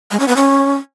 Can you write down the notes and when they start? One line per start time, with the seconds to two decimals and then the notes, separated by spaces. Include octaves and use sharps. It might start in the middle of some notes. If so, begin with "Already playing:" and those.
0.11 G#3
0.20 C#4
0.28 B3
0.36 C#4